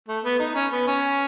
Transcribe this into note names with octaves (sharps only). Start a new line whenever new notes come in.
A3
B3
D#4
C#4
B3
C#4